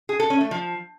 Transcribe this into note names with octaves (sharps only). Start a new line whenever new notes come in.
G#4
A4
C#4
A3
F3